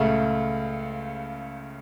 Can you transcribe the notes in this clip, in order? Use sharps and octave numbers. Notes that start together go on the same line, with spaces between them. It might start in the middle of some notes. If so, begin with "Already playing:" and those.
Already playing: C#2 C#3 A3